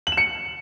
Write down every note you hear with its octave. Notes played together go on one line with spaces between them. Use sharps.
F#7
E7
C#7